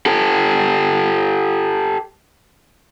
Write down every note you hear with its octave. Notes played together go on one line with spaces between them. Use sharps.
G4 A4